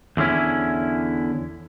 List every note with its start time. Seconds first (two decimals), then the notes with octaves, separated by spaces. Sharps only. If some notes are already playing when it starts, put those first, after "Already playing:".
0.17 E2 D3 G3 C#4 E4